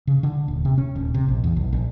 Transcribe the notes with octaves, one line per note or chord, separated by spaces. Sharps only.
C#3
D3
D#1
C3
C#4
D#1
C3
A#1
E2
B1
A#1